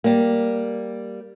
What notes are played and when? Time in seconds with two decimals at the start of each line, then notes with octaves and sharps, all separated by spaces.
0.04 G3 A#3